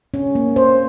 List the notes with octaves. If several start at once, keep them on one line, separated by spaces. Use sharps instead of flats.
C#4
A#3
C5